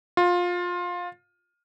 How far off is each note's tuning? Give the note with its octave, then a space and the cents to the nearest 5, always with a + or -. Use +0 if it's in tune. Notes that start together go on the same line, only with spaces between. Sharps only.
F4 +20